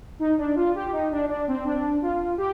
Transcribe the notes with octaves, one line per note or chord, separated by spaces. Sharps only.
D#4
D4
F4
G4
D#4
D4
D4
C4
D4
F4
G4